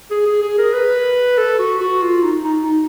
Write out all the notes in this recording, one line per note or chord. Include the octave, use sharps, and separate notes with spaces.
G#4
G#4
G#4
A#4
B4
A4
F#4
F#4
F4
D#4
D#4
D#4